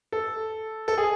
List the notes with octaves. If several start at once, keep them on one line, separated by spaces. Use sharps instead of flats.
A4
A4
G#4